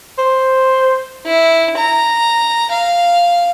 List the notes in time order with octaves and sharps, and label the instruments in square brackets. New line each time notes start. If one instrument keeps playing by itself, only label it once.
[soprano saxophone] C5
[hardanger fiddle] E4
A#5
F5